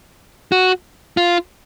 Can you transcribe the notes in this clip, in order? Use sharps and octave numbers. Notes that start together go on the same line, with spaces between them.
F#4
F4